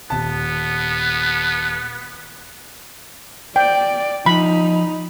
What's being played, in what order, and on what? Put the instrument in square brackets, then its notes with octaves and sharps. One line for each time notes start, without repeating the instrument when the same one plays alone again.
[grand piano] D#1 A5 [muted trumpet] B3
[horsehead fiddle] D5 [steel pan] G5
[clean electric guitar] F3 [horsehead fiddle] D#4 [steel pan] B5